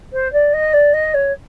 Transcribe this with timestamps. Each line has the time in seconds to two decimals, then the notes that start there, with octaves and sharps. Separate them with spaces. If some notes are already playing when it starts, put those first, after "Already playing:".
0.13 C5
0.32 D5
0.53 D#5
0.73 D5
0.93 D#5
1.14 C#5